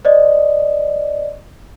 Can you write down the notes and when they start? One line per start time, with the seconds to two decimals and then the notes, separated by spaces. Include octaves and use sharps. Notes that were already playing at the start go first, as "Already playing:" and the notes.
0.05 C5 D5 D#5